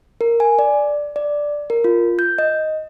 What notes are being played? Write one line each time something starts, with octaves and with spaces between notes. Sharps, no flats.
A#4
G#5
D5
D5
A#4
F4
G6
D#5